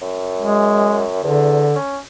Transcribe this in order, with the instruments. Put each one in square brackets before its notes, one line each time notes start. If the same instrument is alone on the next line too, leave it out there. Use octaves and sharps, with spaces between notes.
[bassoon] F#2
[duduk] G#3
[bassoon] E2 [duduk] D3
[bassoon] C#4